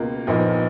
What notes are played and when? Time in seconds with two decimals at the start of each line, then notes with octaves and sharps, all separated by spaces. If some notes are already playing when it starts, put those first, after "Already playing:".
Already playing: C#2 B2 A#3 F4
0.27 A#1 A#2 F3 B3 D#4